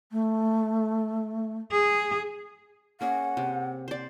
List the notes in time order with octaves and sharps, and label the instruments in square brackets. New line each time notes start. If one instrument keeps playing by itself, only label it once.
[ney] A3
[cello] G#4
[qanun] A#3 C#4 G#4 [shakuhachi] F#5
[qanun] C3
C5 D5